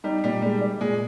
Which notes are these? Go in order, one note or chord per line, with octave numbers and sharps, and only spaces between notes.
G3 D#4
A#2 G3
G3 G#3
D5
A#2 G#3